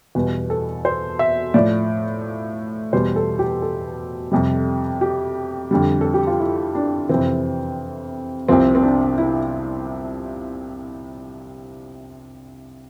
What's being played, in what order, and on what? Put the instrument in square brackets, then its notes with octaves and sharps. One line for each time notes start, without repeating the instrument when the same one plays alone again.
[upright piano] E2 B2 G3 B4
A4
C5
E5
A2 F3 D5
E2 B2 G3 C5
A4
G4
A4
F2 C3 G3
G4
F2 D3 G3
A4
G4
F4
E4
D4
F2 C3 E3 C4
C2 C3 F3 C4
C4
D4
E4